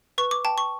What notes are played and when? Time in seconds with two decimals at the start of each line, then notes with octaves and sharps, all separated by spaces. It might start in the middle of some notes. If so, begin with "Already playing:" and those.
0.18 B4 C#6
0.31 D6
0.45 G5 A5
0.58 C#6